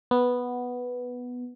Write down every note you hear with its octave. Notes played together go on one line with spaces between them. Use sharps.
B3